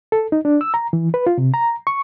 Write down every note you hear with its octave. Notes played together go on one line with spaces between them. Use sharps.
A4
D#4
D4
E6
A#5
E3
B4
F4
C3
A#5
C#6